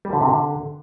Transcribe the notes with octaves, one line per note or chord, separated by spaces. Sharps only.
G3
D3
C3
D3